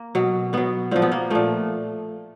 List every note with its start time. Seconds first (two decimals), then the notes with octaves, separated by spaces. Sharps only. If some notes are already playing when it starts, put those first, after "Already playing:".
Already playing: A#3
0.15 B2 F#3
0.53 B2 F#3 B3
0.91 A#2 F3 C4
1.02 B3
1.12 A#3
1.30 A#2 F3 A3